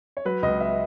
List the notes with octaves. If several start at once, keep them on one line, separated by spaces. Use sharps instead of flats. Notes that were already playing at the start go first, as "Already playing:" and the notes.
C#5
F#3 B4
C#2 D#5
E5